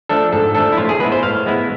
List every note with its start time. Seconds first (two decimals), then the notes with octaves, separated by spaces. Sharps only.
0.09 F3 A3 D4 A4
0.32 G#2 A4
0.55 F3 A3 D4 A4
0.72 E4
0.77 A2 F4
0.89 G#4
1.00 G#3 B3 E4 B4
1.12 C5
1.23 A2 F5
1.46 G#3 B3 E4